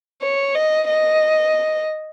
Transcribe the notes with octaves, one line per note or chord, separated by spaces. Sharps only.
C#5
D#5
D#5